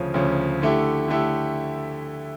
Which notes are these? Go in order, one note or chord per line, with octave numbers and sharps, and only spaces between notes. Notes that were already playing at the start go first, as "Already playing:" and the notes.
Already playing: D2 C#3 F3 C#4
D2 C#3 F3 C#4
D3 A3 E4 G4
D3 A3 E4 G4